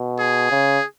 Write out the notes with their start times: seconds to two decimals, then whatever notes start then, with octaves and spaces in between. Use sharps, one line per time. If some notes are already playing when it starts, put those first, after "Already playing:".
Already playing: B2
0.19 G#4
0.51 C#3